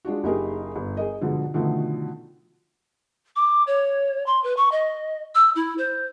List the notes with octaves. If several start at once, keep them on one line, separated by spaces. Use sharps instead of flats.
G#3 D4 F4 F#4
F#1 D#4 G4 G#4 A#4
G1
G#4 A#4 D#5
G#2 B2 D3 F3
B2 D3 D#3 F3 A3
D6
C#5
C6
B4
C#6
D#5
E6
E4
C5